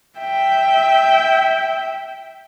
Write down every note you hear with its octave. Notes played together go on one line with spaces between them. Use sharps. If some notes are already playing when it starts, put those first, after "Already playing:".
E5 G5